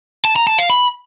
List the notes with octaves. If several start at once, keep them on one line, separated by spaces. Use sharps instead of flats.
A5
A#5
A5
F5
B5